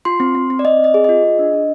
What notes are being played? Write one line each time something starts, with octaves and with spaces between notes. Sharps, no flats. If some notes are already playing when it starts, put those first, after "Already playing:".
F4 C6
C4
C4
C4
D5
C4 D#5
C4 D#5
G#4
F4 D#5
G#4
D4
D4